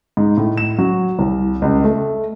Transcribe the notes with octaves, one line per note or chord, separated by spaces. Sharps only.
G#2
A2
E7
F#3
C2
C#2
A3